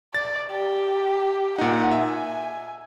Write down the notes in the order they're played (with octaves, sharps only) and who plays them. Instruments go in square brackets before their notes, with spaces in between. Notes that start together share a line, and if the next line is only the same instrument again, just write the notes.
[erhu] D5 [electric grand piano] A6
[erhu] G4
[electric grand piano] A#2 D#4 [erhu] F#5
[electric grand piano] E5 [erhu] G#5